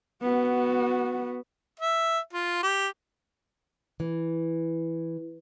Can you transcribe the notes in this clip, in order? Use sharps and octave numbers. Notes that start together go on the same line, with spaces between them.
B3 F#4
E5
F4
G4
E3